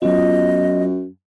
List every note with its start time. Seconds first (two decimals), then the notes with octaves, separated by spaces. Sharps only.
0.02 F#2 F#3 B3 F4 D#5